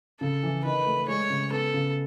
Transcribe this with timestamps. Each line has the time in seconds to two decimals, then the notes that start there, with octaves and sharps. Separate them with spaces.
0.20 C#3 A4
0.43 E3
0.64 D#3 B4
0.86 A3
1.08 G#3 C#5
1.30 C#3
1.52 B3 A4
1.74 C#3